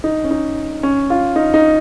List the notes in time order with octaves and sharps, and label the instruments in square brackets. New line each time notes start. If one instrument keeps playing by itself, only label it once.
[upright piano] D#4
C#4
D#4
C#4
F4
D#4
D#4